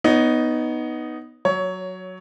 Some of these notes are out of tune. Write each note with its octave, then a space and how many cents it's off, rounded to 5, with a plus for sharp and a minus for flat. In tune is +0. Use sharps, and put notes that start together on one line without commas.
B3 +0 D#4 +0 C#5 +25
F#3 +0 C#5 +15